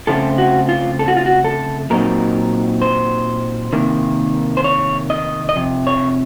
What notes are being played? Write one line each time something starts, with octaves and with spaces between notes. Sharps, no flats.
C#3 F3 A3 C4 F4 A4
F#4
F4
A4
F#4
F4
F#4
A4
A#2 F#3 C4 D#4 A#4
C5
C3 D#3 A#3
C5
C#5
D#5
D#5
F2 C3
C#5